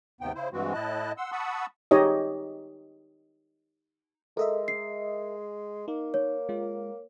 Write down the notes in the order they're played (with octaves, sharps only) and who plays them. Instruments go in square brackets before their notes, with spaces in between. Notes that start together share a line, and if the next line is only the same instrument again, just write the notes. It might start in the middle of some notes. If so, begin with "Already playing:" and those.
[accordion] D#2 G#2 C3 B3 G5
C#3 E4 C5
G2 E3 G#3 C4 F#4
A2 E4 D#5 A5 F#6
F#5 C6 E6
F#5 A5 B5 C#6 D#6 E6
[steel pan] D#4 G4 C#5 D#5
[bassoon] G#3 [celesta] A4 [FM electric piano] A#4 D#5 E5
[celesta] C7
[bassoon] A#3 [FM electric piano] D#4
[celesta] C#5
[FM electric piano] G#3 F4